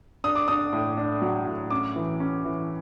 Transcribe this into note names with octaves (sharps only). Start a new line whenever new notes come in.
D4 D#6
D6
D4 D#6
A2
D4
F#3
A2
C#4 D6
E3
C#4
E3